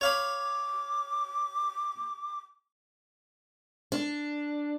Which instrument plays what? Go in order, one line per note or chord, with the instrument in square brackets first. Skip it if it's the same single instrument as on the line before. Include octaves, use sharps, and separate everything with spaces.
[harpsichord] C#5 F5 B5 [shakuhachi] D6
[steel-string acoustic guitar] D4